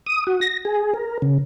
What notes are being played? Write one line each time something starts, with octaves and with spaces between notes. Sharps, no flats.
D#6
F#4
A#6
G#4
A#4
C#3